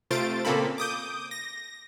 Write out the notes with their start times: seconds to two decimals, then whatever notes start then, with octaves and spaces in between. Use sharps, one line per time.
0.11 C3 A3 F4 C5 A6 D7
0.45 A#2 C#3 A#3 C4 A4 B5
0.78 D6 D#6 G6
1.31 A#6